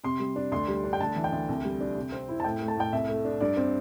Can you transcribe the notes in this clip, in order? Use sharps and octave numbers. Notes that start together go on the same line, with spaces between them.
C3 C6
G3
D4
D2 C6
G3
D4
G5
D2 A5
E3
G5
D2
C2
G3
D4
C3
C4
E4
A5
A2 G5
A3
A5
A2 G5
C2 E5
A3
D4
G2 D5
C4